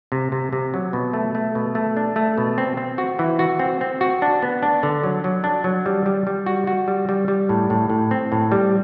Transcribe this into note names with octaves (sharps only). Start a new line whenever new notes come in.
C3
C3
C3
F#3
B2
A3
A3
B2
A3
D4
A3
B2
C4
C4
F#4
E3
F#4
C4
C4
F#4
D4
B3
D4
D3
F#3
F#3
D4
F#3
G3
G3
G3
F#4
F#4
G3
G3
G3
A2
A2
A2
C4
A2
G3